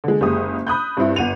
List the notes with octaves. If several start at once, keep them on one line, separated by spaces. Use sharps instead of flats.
D3 G#3
F#1 G#3 G4 D#6
B5 D#6 F#6 G6
G2 C4 E4
G1 F#5 D#7 F7